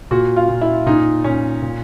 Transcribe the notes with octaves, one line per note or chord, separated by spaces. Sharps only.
A#2 F#4
F4
A#2
E4
A#2 D#4
A#2 C#4
A#2